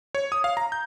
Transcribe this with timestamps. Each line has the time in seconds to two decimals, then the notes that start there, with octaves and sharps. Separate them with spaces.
0.15 C#5
0.32 D#6
0.44 F5
0.57 A#5
0.72 G6